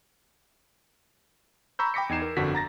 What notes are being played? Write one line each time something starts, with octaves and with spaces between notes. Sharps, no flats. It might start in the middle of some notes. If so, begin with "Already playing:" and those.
A#5 B5 C#6 E6 G6
G5 B5 D6 A#6 B6 C#7
E2 D#4 G#6 C7 E7
A#4
G1 F2 D3 F#4 B6
A#5 A6 A#6